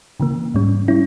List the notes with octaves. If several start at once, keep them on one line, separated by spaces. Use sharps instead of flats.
C#3 E3 A#3
G#2 G3 C#4
G3 C#4 E4